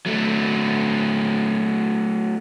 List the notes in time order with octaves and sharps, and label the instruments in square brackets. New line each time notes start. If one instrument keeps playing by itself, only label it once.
[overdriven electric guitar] F#3 A3